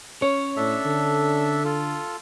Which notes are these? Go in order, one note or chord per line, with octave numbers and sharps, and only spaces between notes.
C#4 C#5
A2 D4 A4 E5
D3
F4 A4